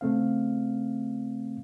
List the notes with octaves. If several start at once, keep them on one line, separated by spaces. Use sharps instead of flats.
C#3 A3 C4 F5